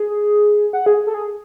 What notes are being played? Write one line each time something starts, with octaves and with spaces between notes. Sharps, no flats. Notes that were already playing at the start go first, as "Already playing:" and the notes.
Already playing: G#4
F#5
G#4
A4
G#4